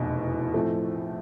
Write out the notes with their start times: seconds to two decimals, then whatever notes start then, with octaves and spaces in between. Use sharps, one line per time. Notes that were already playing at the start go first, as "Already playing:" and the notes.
Already playing: F1 E2 B2
0.54 A2 F3 A3 C4